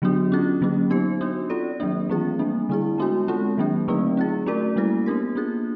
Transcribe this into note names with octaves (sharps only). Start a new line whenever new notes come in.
D3 F#3 B3 D4 F#4
C#4 F4 G#4
D3 F#3 A#3 C#4
B3 D#4 G4 C5
B3 D4 F#4
C4 F4 A4 D5
D#3 F#3 A#3 D4
E3 A3 C4 F4 G#4
G3 A#3 D4
D3 G3 C4 E4 G#4
G#3 B3 D4 F#4
G#3 C4 F4 A4
D#3 F#3 A#3 D4
D3 F#3 A3 C4 D#4
C4 F4 G#4
A3 C#4 F#4 A#4 D5
G3 A#3 C#4 E4 A4
B3 D4 G4 A#4
A#3 D4 F4 G#4